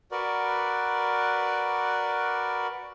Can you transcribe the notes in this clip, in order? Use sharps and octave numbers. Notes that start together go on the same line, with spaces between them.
F#4 A#4 B4 D5